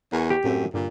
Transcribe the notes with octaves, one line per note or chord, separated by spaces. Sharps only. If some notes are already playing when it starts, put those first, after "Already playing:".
E2 A#4 G#5 C#6
G4
F#2 A2 A3 C4
G2 A#2 D3 G3